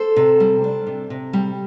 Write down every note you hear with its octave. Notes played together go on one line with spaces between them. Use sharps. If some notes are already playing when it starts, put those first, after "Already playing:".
Already playing: A4 C5
C3
G3
D4
C3
C3
G3